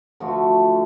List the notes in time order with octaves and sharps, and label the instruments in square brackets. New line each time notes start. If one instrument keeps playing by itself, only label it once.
[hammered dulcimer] D3 F3 A3 F#4